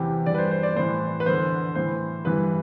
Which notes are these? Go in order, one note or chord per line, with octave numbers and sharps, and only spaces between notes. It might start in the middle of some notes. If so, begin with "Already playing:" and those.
Already playing: E2 C3 E3 G4
G2 E3 D5
B4
C5
C5
D5
A2 E3 C5
B4
E2 D3 C5
A2 E3 C5
G2 E3 B4